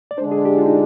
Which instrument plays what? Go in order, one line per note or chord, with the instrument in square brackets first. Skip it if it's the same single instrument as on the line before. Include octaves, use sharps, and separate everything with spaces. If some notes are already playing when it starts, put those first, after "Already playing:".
[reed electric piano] D5
[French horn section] D3 G#3 D4 [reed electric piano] C5
[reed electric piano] G#4
G4
F4
D#4